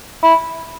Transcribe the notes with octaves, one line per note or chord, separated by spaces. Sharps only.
E4